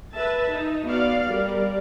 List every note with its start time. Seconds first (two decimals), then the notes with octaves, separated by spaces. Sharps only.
0.13 B4 E5 A5
0.51 D#4
0.85 B3 F#4 D5 F5
1.31 G3 A#4 D5